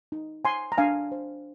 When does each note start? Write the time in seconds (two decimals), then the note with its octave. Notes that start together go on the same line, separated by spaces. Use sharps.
0.12 D#4
0.44 C5 G#5 C6
0.72 A#5
0.78 D4 F5 G#5
1.12 C5